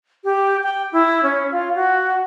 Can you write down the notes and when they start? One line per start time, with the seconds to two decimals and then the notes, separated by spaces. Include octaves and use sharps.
0.24 G4
0.63 G5
0.92 E4
1.23 C#4
1.52 F4
1.75 F#4